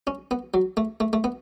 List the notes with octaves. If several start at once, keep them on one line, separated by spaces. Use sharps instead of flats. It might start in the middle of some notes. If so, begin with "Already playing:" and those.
C#4
B3
F#3
A3
A3
A3
B3